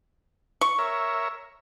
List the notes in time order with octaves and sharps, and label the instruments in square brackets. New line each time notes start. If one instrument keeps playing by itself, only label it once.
[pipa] C#6
[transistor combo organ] A#4 C#5 E5